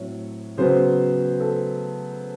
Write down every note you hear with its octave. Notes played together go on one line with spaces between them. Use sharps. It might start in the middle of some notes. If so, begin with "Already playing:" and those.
Already playing: A2 F#3 C4 C#5
C#3 F#3 B3 C5
A4